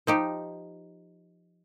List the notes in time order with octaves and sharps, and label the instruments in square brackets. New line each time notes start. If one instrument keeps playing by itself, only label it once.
[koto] F3 D#4 G4